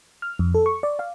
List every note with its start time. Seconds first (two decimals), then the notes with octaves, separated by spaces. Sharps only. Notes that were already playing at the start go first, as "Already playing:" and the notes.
0.22 F6
0.39 F2
0.55 A4
0.66 C#6
0.83 D5
0.99 F5